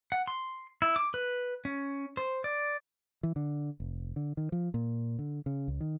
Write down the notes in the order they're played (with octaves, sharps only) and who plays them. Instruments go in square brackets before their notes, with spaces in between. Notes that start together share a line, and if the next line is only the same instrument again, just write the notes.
[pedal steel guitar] F#5
C6
E4
D6
B4
C#4
C5
D5
[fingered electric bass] E3
D3
F1
D3
D#3
F3
A#2
D3
C#3
C#2
D#3